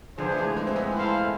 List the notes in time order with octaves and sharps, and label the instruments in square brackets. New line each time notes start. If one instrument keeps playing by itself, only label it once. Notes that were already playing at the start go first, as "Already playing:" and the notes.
[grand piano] D3 F3 [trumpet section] B3 D4 G#4 C5
[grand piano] A3
E3 G#3
E3 G#3
C4
G#3 B3
[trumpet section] E4 A4 C5 F5